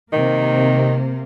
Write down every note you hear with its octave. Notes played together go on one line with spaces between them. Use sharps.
C3 D#3 A#3